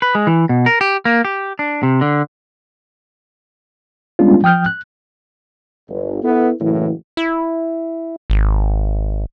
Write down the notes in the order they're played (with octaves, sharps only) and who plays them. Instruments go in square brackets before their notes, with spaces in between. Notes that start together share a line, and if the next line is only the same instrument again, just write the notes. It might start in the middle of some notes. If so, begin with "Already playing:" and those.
[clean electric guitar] B4
G#3
E3
B2
A#4
G4
A#3
G4
D4
C3
D3
[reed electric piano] G3 G#3 B3 C#4 D4 F4
F3 G5 D#6 F6 G6
F#6
[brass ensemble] G1
B3 E4 A4 B4
F#1 A2 E3
[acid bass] E4
G#1